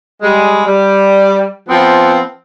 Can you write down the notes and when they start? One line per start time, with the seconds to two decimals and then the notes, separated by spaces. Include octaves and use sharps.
0.23 G3 G#3
0.66 G3
1.69 F3 B3 C4